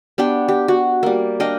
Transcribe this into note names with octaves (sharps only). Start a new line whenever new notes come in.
B3 D4 G4 G5
G4
F#4
G3 A#3
D4 D#5 F5 G5